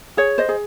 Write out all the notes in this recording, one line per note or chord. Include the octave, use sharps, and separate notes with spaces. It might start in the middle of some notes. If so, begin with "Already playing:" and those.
G#4 C#5
C5 D#5
G#4